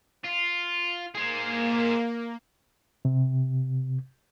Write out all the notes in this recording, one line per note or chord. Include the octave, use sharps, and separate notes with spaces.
F4
A#3 G#4 C5
C3